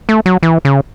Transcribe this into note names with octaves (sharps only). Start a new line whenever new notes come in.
A3
F#3
E3
C#3